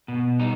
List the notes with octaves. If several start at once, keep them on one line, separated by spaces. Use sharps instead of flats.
B2
G3 D#4